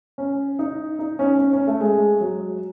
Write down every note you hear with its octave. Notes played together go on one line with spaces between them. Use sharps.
C#4
D#4
D#4
C#4
C#4
C#4
A3
G#3
F#3